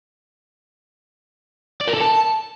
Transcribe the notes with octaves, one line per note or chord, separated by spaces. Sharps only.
D5
A#4
A4
A5